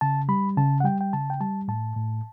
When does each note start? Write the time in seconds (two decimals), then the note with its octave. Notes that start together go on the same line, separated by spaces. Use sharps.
0.01 C#3 A5
0.29 G3 B5
0.57 C#3 A5
0.80 F#5
0.84 G3 G5
1.01 G5
1.13 C#3 A5
1.30 G5
1.41 G3 A5
1.68 A2 A5
1.96 A2